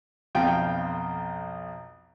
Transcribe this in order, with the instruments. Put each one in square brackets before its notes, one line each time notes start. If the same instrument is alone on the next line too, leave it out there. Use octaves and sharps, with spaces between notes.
[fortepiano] B1 F2 F4 G5